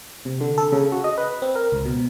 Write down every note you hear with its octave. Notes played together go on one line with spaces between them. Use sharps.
C3
D3
A4
C#3
F#4
D#5
B4
C4
A#4
C#2
B2